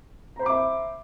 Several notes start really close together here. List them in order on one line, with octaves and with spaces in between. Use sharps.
A#5 C5 B5 D6 E5